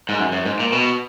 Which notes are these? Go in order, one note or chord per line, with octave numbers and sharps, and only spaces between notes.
G#2
F#2
F#2
G#2
A#2
B2